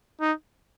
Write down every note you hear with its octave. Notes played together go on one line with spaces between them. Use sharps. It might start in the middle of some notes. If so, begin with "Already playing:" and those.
D#4